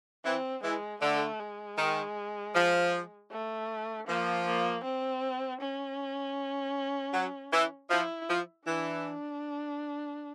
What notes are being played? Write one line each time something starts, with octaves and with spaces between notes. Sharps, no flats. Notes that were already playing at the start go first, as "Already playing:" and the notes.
E3 C4
E3 G#3
D3 A3
G#3
D#3
F3
A3
F3 A#3
A#3
C4
C#4
F#3
E3
F3 E4
F3
E3 D4